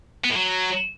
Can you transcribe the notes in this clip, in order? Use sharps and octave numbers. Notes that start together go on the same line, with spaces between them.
B3
A2
F#3